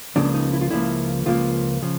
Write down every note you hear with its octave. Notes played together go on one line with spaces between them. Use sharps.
C#2 C#3 F3 A#3 D4
D#4
E4
F4
C#2 C#3 F3 A#3 E4
C#2 C#3 F3 A#3 F4
C#3 F3